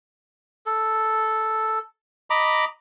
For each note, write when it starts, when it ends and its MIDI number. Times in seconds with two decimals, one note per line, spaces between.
0.66 1.79 69
2.30 2.65 75
2.30 2.65 82
2.30 2.65 83
2.30 2.65 86